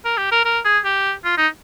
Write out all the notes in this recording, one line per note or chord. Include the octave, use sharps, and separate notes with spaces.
A#4
G4
A#4
A#4
G#4
G4
F4
D#4